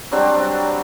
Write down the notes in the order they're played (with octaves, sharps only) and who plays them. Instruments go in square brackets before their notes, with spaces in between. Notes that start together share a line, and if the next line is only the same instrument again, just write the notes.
[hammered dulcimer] F#3 G3 C4 D4